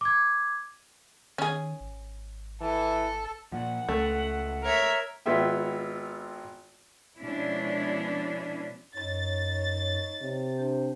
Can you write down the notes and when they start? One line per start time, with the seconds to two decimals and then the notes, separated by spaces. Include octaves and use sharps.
0.01 D6 G#6
1.38 D#3 C#4 G#4
1.81 G#1
2.61 E3 A4
3.52 A#2 F3 F#5
3.89 C#2 A3
4.64 A#4 C#5 E5
5.26 G#1 B3 F4 G#4 E5 G5
7.19 B2 F3 G#3 C#4 D4 E4
8.96 F#2 D#4 C#5 A6
10.22 C3
10.58 D4 C5